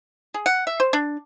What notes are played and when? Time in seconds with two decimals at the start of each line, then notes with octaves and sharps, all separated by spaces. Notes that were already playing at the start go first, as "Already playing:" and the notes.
0.34 G#4
0.46 F#5
0.67 E5
0.80 C5
0.93 D4